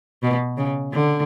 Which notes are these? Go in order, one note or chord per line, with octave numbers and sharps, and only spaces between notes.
B2
C#3
D3